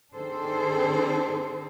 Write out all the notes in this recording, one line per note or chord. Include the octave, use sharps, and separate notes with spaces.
D#3 C4 D4 G#4 A4 C5